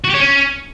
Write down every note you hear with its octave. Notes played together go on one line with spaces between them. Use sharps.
F#4
G4
C#5
C#4